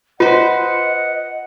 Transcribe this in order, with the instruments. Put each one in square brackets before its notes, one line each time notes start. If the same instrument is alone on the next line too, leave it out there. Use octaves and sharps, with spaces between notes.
[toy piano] F4 [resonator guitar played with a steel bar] B4 C5 [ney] D#5 [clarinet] F#5